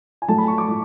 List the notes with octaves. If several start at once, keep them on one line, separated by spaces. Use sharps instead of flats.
G#5
A2 F#3 A3 A5
B5
C#6
D6
A2